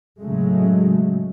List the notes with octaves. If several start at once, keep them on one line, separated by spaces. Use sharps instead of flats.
A2 C#3 F#3 G#3 A3